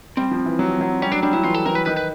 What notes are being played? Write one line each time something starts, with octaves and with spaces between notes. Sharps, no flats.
G3 C4
F3
E3
F#3
F#3
G3 C#4
F#3 D4
G3 D4
F#3 E4
E3 F4
A4
E3 A#4
B4
D#3 B4
B4